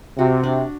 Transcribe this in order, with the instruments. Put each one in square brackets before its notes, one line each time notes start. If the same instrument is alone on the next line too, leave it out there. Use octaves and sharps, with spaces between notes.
[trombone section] C3 [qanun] F#4
[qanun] D4